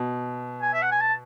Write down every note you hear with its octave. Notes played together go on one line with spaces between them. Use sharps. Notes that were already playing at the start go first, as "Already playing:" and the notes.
Already playing: B2
G#5
E5
F#5
G#5
A5